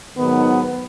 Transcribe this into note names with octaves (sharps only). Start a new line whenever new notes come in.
G#2 D#3 F#3 B3